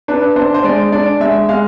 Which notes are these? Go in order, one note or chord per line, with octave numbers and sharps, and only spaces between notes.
D4 B4
D4 C5
C5
G#3 D5
D4 D5
G#3 E5
G#3 F5